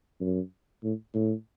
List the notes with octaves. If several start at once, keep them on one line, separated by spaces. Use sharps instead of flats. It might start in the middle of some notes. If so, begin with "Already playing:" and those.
F#2
A2
A2